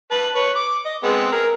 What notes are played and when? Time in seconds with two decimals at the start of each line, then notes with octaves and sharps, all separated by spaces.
0.11 B4 A5
0.35 B4 C#5
0.55 D6
0.85 D#5
1.03 G#3 B3 C4
1.32 G#4 A#4